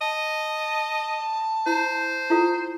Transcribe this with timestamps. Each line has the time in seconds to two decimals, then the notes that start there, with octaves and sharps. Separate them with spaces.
0.01 D#5 A5
1.66 E4 C5
2.30 E4 F4 A4